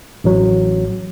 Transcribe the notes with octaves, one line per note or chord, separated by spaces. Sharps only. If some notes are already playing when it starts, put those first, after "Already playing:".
A1 F#3